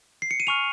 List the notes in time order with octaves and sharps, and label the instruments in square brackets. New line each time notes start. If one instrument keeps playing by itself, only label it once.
[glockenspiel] C7
C#7
D#7
G#5 C#6 F6 F7